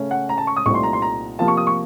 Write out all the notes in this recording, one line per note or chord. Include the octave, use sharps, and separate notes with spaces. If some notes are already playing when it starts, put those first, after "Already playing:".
Already playing: C#3 A3 C#4
F#5
A#5
A5
C#6
D#6
C2 A#2 A3 C4 D#4 C#6
C6
A#5
C6
A#5
C3 F3 A#3 F4 A5
C#6
D#6
C#6